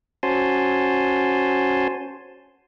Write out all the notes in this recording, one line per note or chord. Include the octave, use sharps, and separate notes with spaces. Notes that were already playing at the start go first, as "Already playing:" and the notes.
C#4 F#4 C5 G#5 A5 C6